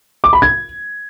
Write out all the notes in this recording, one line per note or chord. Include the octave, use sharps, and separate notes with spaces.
D6
B5
G#6